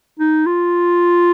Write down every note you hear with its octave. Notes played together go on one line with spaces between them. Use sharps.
D#4
F4